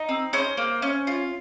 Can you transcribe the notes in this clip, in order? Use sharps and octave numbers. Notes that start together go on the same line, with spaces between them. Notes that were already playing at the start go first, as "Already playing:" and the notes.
Already playing: D#4
C4
C#4 C5
A#3
C#4
F4